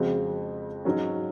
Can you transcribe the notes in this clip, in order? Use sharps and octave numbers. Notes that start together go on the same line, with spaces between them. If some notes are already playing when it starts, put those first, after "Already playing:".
Already playing: F2 C#3 G#3 C4 F#4
G#2 F#3 C#4